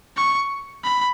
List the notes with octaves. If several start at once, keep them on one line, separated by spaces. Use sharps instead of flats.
C#6
B5